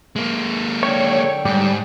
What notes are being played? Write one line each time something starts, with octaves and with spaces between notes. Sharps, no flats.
G#3 A#3
D3 C#5 G5
G#2 G3